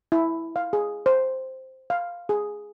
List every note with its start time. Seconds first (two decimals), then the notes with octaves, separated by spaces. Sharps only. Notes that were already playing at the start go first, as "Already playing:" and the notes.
0.12 E4
0.56 F5
0.73 G#4
1.06 C5
1.90 F5
2.29 G#4